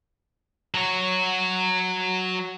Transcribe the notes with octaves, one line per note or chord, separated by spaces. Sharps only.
F#3 F#4